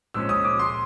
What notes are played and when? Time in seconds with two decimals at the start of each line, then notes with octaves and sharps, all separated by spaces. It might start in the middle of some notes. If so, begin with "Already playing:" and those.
0.14 A#2 F3 G#3 C#4 E6
0.29 D#6
0.45 D6
0.59 C6